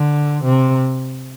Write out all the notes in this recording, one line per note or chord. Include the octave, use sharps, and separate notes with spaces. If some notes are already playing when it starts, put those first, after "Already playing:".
Already playing: D3
C3